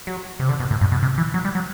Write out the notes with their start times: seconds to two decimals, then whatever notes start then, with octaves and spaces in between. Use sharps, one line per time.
0.07 F#3
0.40 C3
0.49 D3
0.60 B2
0.71 A2
0.81 G2
0.92 B2
1.02 C3
1.18 E3
1.34 F#3
1.45 G3
1.55 F#3